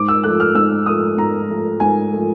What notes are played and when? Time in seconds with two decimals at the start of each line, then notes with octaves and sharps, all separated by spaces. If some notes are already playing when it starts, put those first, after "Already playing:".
Already playing: G#2 D6
0.08 E6
0.23 F3 A3 F#6
0.40 F6
0.55 G#2 E6
0.86 F3 A3 D#6
1.17 G#2 A#5
1.49 F3 A3
1.80 G#2 G#5
2.12 F3 A3